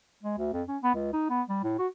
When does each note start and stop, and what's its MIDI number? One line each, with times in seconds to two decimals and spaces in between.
0.23 0.37 56
0.38 0.49 38
0.53 0.62 41
0.68 0.77 61
0.83 0.91 59
0.95 1.08 37
1.13 1.26 63
1.30 1.42 59
1.48 1.60 55
1.63 1.74 45
1.78 1.87 66